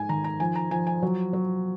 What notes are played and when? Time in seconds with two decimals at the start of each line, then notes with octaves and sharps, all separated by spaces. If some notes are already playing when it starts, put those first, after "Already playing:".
Already playing: G#2 G#5
0.09 D#3 A#5
0.24 A#5
0.40 F3 G#5
0.56 A#5
0.71 F3 G#5
0.87 G#5
1.02 F#3
1.33 F#3